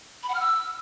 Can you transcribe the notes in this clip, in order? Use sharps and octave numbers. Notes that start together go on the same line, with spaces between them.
B5
F#5
F6
E6